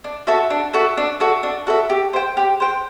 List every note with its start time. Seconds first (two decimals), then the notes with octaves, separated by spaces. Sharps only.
0.04 D4
0.27 F#4 A4 E5
0.50 D4
0.73 F#4 A4 E5
0.97 D4
1.20 F#4 A4 E5
1.43 D4
1.67 F#4 A4 E5
1.90 G4
2.13 C5 G5
2.37 G4
2.60 C5 G5